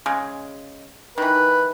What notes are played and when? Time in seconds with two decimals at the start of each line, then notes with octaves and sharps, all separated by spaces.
0.06 C#3 G#3
1.18 D#3 E3 B4